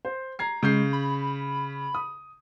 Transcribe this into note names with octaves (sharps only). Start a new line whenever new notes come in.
C5
A#5 G#6 C7
C#3 G#3 G6 C7
B5
D#6